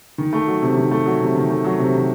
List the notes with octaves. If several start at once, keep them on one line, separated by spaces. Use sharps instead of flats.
D#3
A3
F#3
C3
D#3
A3
F#3
C3
D#3
A3
F#3
C3
D#3